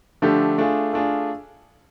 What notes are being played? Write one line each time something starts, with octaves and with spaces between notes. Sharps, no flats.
D3 F3 A3 D4 G4
A3 D4 F4 G#4
A3 D4 F4 G#4